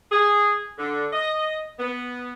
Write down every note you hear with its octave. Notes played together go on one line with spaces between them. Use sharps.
G#4
D3
D#5
B3